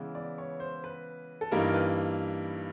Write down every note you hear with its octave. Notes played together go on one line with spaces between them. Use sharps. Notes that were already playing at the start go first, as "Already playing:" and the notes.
Already playing: C#3 E3 G#3 B3 E4
D5
C#5
C5
B4
A4
G2 E3 G3 A#3 D#4 A#4
B4